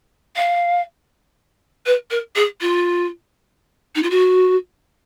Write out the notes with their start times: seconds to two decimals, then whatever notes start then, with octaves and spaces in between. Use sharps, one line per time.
0.36 F5
1.86 B4
2.11 A#4
2.36 G#4
2.61 F4
3.95 D#4
4.03 F4
4.10 F#4